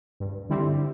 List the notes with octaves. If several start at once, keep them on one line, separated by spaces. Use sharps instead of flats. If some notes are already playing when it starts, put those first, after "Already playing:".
G2
D3 G3 C4 E4